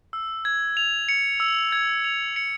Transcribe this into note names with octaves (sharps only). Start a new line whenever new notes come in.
E6
G#6
F7
C#7
E6
G#6
F7
C#7